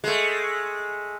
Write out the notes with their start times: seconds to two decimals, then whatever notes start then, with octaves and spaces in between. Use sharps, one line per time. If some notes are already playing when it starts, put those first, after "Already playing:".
0.04 G#3 A3